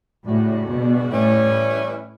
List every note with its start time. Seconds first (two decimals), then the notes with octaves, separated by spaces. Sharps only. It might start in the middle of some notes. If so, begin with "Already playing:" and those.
0.25 A2 C#3 G3 D4 F#4
0.68 B2
1.10 A2 E3 G3 C#4 E4